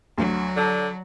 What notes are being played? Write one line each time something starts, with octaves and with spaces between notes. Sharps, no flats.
D2 F#3
D3 D5 A5